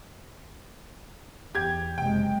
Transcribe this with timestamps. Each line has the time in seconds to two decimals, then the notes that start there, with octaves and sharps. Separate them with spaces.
1.55 E2 G4 G#6
1.98 F#1 C3 G#3 G5